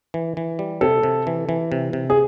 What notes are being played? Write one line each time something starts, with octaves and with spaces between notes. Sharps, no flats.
E3
E3
G3
C3 A4
C3
E3
E3
C3
C3
G#4